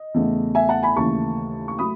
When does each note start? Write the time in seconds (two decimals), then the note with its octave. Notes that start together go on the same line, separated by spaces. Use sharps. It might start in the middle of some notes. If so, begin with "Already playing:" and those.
Already playing: D#5
0.14 E2 C#3 E3 A3
0.55 E5 G#5
0.69 F#5 A5
0.83 G#5 B5
0.96 D#2 C#3 E3 A3 A5 C#6
1.68 C#6
1.79 F#3 A3 B5 D#6